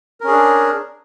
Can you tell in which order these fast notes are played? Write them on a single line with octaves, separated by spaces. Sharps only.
A#4 C#4 G#4 D4